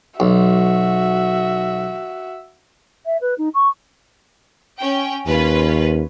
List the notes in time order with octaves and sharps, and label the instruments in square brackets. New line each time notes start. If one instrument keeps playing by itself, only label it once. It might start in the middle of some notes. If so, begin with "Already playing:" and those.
[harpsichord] B1 [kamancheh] F#4 E5
[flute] E5
B4
D#4
C#6
[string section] C#4 G5
[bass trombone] D#2 [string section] C#4 F4 B4